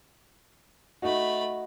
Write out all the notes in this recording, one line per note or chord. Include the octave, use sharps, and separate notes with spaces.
A3 D#4 F#4 B5